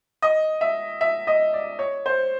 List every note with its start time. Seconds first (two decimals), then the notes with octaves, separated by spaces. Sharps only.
0.22 D#5
0.61 E5
1.01 E5
1.27 D#5
1.53 D5
1.79 C#5
2.06 C5